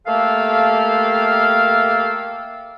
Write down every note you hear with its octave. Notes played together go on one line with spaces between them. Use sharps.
A3 A#3 G4 A4 F5